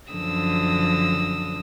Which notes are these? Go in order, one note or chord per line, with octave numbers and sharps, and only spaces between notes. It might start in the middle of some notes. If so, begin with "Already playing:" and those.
F#2 D3 F3 D#6 E6 A#6